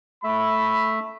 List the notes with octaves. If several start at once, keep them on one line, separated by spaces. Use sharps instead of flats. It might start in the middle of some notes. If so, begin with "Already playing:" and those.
A3 E5 B5